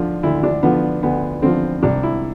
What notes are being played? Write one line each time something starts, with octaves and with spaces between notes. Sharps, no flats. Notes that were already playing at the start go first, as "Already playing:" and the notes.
Already playing: D2 D3 F3
D2 E4
D4
D3 F3 B3
D2 B3
D3 F3 C4
C2 D4
E4